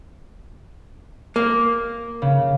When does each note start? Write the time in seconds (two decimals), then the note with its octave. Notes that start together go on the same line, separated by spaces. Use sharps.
1.36 A#3
2.22 C#3